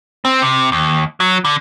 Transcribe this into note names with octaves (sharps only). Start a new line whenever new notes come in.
C4
C3
D#2
F#3
D3